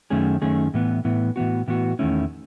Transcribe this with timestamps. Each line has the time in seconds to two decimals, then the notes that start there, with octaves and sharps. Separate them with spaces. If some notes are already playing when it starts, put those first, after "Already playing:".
0.10 F#2 D#3 A3 C#4 G#4
0.42 F#2 D#3 A3 C#4 G#4
0.74 A2 E3 B3
1.05 A2 E3 B3
1.36 A2 E3 B3 F#4
1.68 A2 E3 B3 F#4
1.99 E2 D#3 A3 C#4 E4